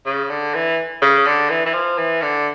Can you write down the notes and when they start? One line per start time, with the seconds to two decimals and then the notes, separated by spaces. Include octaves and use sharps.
0.06 C#3
0.30 D3
0.54 E3
1.02 C#3
1.26 D3
1.50 E3
1.66 E3
1.74 F3
1.98 E3
2.22 D3